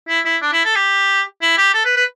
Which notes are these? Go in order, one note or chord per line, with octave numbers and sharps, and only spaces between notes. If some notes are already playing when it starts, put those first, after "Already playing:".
E4
E4
D4
E4
A4
G4
E4
G4
A4
B4
B4